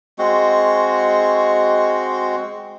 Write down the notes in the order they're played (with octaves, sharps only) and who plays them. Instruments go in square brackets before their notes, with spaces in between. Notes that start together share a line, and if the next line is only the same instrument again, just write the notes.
[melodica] G#3 C4 F#4